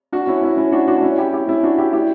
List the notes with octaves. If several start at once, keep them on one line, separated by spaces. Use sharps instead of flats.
D4 F#4
C#4 E4
C#4 E4
C#4 E4
D4 F#4
D4 F#4
D4
C#4 E4
E4 G4
E4 G4
C#4 E4
D4 F#4
E4 G4
E4 G4